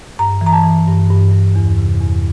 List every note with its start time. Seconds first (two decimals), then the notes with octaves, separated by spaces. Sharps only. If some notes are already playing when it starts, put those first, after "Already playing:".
0.19 G2 A#5
0.41 E3
0.46 A#5
0.53 A5
0.64 E3
0.87 G2
1.10 G2
1.32 G2
1.56 E2
1.78 C3
2.00 E2